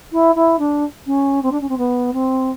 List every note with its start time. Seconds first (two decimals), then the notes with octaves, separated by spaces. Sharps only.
0.12 E4
0.35 E4
0.59 D4
1.07 C#4
1.43 C4
1.52 D4
1.61 C#4
1.69 C4
1.78 B3
2.13 C4